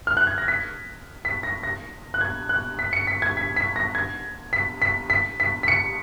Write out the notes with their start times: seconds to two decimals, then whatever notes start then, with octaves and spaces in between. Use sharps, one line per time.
0.07 F6
0.17 F#6
0.27 G#6
0.38 A#6
0.48 B6
1.25 B6
1.43 A#6
1.63 A#6
2.14 F#6
2.21 G#6
2.49 F#6
2.79 B6
2.93 C#7
3.07 B6
3.22 G#6
3.37 B6
3.56 B6
3.76 A#6
3.95 G#6
4.53 B6
4.82 B6
5.10 B6
5.40 B6
5.63 B6
5.68 C#7